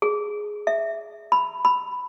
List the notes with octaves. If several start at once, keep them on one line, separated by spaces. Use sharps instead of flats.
G#4
E5
B5
B5